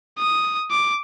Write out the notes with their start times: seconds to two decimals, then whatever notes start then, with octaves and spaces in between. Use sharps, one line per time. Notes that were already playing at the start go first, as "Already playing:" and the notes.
0.19 D#6
0.71 D6